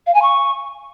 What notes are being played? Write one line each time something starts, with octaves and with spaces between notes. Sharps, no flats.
F5
G#5
C#6